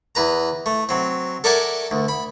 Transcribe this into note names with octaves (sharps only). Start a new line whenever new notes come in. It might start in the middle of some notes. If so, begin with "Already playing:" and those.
E2 B4 A#5
A3
F#3 C4
A4 A#4 D5 E5 F#5 G#5
D2
B5